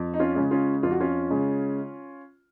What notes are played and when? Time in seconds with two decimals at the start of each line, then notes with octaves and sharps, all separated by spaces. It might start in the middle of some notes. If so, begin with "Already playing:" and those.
Already playing: F2
0.14 D#4
0.19 C#4 F4
0.35 C#3 G#3
0.51 C#4 F4
0.83 F2 F4
0.91 F#4
1.00 C#4 F4
1.30 C#3 G#3